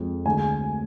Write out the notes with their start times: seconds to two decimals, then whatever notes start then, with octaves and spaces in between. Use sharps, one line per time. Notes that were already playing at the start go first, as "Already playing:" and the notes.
Already playing: F2 F3 G#3
0.25 D2 D3 G#3 G#5